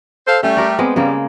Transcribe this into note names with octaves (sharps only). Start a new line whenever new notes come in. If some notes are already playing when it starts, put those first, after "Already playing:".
A4 C5 F5
G3 A3 C#4
G4 A#4 D5
G#3 B3 C4
C#3 G3 G#3 A#3